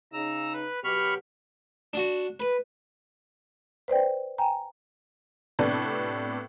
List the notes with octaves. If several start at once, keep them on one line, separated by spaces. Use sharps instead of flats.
C#3 D#4 A#5 E6
B4
B2 F#3 G4 B5 C#6 F6
D4 F#4
B4
B4 C5 D5 G5
G5 G#5 A#5
A2 C3 B3 D4 A4